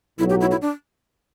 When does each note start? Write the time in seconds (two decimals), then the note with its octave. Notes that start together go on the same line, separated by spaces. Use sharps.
0.19 B1 A2 F#3 E4
0.30 G4
0.41 E4
0.51 E4
0.62 D4